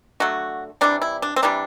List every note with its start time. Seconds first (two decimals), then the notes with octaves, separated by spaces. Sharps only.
0.20 D3 F#3 A3 F#4
0.81 C3 E3 G3 D4
1.02 E4
1.22 D4
1.36 C4
1.43 C3 E3 G3 D4